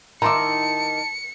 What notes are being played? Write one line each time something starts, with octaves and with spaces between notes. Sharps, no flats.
D#3 E4 A5 A#5 C6 D6 C#7